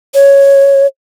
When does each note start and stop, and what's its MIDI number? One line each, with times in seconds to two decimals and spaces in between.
0.15 0.86 73